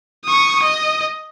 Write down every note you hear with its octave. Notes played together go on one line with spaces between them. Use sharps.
C#6 D#6
D#5